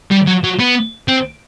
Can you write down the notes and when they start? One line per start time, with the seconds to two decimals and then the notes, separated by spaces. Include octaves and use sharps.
0.11 G3
0.27 F#3
0.44 F#3
0.60 B3
1.08 C4